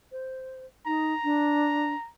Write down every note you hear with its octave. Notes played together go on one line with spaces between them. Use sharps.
C5
D#4 A#5
D4